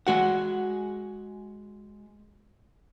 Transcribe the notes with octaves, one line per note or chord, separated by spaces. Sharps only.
G#3 F#4 F#5